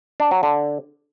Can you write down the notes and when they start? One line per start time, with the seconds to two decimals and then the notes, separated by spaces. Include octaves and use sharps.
0.20 D4
0.31 F#3
0.43 D3